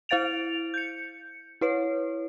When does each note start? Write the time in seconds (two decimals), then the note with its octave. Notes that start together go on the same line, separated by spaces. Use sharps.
0.09 E4 C5 F5 A6 D7 F7
0.74 G6 C#7
1.61 E4 B4 C#5